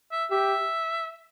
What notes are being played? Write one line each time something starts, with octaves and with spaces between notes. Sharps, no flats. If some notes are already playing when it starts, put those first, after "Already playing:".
E5
G4 E5